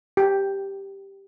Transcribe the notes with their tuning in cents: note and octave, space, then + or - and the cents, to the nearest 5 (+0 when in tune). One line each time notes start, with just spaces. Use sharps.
G4 +0